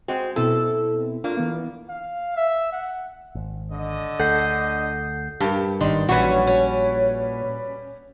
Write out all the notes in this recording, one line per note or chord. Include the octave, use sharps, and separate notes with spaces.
G#3 C4 F#4
B2 C4 E4 A4
A#3 D4 F4
E3 B3
F5
E5
F#5
G#1
D3 D#5
D2 A4 F#5 G6 C7
G2 G4 A#4 A5
G#1 D#3 D4 D#4 C6
A#1 E3 F#3 G3 C#4 D4 F#4 B4
C#4